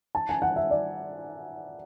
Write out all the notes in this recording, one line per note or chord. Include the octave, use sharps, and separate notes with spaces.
A5
G#5
F#5
E5
D5